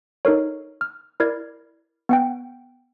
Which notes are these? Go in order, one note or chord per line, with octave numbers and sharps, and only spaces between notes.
D#4 A4 A#4 C#5
F6
E4 A#4 D5 G#6
B3 F#5 G5